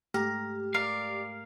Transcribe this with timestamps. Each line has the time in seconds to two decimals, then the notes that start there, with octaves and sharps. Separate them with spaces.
0.14 G#2 A3 G4 A#5 F6
0.74 A#4 D5 F5